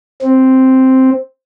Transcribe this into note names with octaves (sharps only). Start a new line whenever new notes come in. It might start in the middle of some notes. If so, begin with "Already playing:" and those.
C4